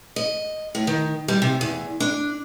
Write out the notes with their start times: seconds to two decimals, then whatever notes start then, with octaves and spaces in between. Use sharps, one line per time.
0.16 D#5
0.75 A2
0.87 D#3
1.28 G3
1.42 C3
1.61 E2
2.00 D4